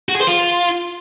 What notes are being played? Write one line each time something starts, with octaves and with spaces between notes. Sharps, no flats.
F#4
G#4
C5
F4